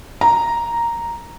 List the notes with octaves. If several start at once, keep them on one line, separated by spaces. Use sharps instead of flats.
A#5